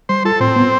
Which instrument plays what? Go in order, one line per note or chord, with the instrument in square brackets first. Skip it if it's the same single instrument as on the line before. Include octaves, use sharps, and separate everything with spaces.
[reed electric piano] G3 [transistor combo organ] C5
[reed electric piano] F4 [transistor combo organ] A4
[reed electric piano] A2 [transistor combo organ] C4
[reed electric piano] B3